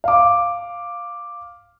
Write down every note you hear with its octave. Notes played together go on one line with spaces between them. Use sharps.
F5 D6